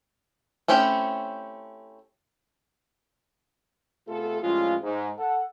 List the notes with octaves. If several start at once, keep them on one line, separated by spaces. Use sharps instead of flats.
A3 C4 C#4 E4 G4
C3 A3 B3 F4 G#4 A4
A2 F3 G3 G#3 C#4 F4
G#2
A4 F#5